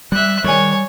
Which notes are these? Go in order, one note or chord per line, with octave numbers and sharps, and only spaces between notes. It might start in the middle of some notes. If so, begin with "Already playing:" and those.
G3 E5 F#6
D#3 G3 G#4 C#5